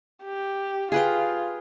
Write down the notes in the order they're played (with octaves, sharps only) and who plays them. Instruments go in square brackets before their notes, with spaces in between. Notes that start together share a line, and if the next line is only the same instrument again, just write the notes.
[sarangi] G4
[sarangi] F4 [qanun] G#4 B4 G5